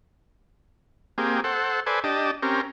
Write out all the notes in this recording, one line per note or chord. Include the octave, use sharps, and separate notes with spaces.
A#3 C4 G4 G#4
A4 C5 F#5
A4 B4 C5 D5 G#5
D4 G4 D#5 A5
C4 C#4 G4 A#4